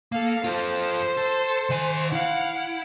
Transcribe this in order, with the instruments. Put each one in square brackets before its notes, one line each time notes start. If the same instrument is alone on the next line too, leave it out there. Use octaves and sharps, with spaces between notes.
[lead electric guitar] A#3 [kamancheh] A4 F5
[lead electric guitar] F4 A4 [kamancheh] C5
[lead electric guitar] A4
D#3 G#5
[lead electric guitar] E4 [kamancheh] F5 F#5